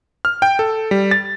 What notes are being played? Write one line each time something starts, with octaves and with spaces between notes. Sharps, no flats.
F6
G5
A4
G3
A6